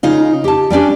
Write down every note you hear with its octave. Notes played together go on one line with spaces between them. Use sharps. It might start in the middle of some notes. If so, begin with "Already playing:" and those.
C#3 D#4 F4
G4 A5
G3 C#4 D4 G4